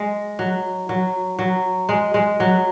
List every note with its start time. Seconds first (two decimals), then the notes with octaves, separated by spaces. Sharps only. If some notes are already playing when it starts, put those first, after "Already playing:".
Already playing: G#3
0.39 F#3
0.89 F#3
1.39 F#3
1.89 G#3
2.14 G#3
2.40 F#3